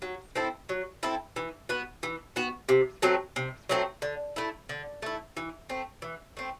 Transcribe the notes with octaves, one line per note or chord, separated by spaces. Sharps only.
F#3
C4 E4 A4
F#3
C4 E4 A4
E3
B3 F#4
E3
B3 F#4
C3
F#3 A3 C4
C3
F#3 A3 C4
D3
A3 E4
D3
A3 E4
E3
A3 C4
E3
A3 C4